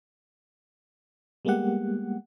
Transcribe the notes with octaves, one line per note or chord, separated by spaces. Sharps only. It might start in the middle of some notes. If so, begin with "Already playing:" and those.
G3 G#3 A#3 B3 G4 F#5